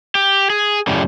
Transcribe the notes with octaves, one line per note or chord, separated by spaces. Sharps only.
G4
G#4
F#2 A2 C#3 G3